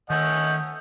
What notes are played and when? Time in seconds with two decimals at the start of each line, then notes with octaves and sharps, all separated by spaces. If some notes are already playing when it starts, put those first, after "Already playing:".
0.10 D#3 A3 C#4 D#5 F#5 G6